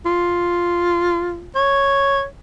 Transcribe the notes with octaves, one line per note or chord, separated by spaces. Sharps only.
F4
C#5